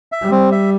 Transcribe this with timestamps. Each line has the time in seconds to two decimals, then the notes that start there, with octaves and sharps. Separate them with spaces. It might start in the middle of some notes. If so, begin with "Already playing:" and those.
0.12 E5
0.22 G3
0.31 C4
0.52 E5